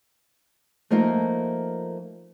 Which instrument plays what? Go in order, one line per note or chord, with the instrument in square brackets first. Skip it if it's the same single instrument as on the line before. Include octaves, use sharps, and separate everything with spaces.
[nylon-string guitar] F3 A3 A#3 D#4 F4 A#4